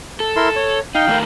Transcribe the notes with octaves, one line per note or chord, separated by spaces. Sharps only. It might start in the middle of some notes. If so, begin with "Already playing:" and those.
A4
E4 A#4 C6
C#5
D#4 F5 G5
D#3 A3 A#4